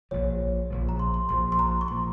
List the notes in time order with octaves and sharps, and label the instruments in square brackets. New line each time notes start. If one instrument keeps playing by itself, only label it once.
[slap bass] A#1 A#2 F3 [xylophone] C#5
[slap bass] A#1 A#2 F3
[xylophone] A#5
C6
C6
[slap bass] A#1 A#2 F3 [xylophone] C6
[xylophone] C6
A#5
C#6
[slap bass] A#2 F3 [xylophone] C6